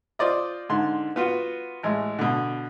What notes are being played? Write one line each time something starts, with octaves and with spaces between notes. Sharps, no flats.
F4 C5 D5 D#5
G#2 D3 C6
B3 F4 F#4
A1 G#3
B2 D3